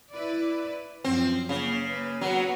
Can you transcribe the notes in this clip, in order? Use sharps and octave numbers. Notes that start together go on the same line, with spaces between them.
E4 B4 D5
F#2 F3 C4
C#3 A#3
A#3 B4
F#3 B3 F#4 B4